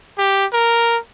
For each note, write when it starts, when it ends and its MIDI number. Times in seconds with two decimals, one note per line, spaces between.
0.18 0.45 67
0.52 0.97 70